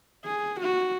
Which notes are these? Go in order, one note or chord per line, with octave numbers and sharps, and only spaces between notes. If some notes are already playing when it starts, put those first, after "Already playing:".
G#4
F#4